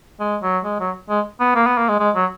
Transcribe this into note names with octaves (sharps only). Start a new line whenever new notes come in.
G#3
F#3
G#3
F#3
G#3
B3
A#3
B3
A#3
G#3
G#3
F#3